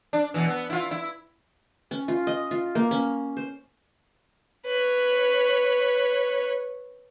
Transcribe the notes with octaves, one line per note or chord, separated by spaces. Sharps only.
D4
B2 E3
B3
E4 F4
E4
C#4
F4
D#5
F4
A#3
C#4
C5
B4 C#5